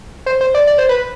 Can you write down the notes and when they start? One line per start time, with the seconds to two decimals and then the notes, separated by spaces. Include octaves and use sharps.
0.26 C5
0.41 C5
0.55 D5
0.67 D5
0.78 C5
0.89 B4